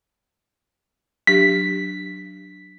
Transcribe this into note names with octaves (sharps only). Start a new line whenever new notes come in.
F#3 D4 G4 B6